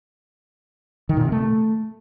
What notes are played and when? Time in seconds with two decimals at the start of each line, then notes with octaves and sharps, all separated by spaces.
1.09 D#3
1.17 A#2
1.24 C3
1.32 A3